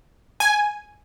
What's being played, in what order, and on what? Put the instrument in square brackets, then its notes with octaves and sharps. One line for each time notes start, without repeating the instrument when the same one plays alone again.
[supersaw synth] G#5